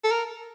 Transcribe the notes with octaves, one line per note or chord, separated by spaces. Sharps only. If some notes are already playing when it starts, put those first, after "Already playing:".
A4
A#4